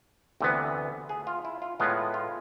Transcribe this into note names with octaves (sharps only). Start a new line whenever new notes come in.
D2 C3 E3 B3
G#4
F4
E4
F4
A2 G#3 B3 F4
F4